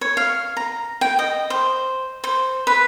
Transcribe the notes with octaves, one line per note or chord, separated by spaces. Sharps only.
C#5
F5
A#5
G5
D#5
C5
C5
B4